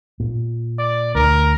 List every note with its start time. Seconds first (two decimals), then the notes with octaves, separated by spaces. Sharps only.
0.20 A#2
0.78 D5
1.15 D2 A#4